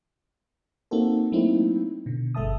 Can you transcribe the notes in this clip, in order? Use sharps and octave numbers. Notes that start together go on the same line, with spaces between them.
A#3 C4 D#4 F#4 A4
F#3 A3 A#3 C4 D#4 E4
B2 D3
G1 G#3 A4 E5 A5 D#6